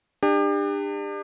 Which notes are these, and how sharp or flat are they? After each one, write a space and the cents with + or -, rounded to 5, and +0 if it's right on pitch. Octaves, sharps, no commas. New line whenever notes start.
D4 +35 G4 +35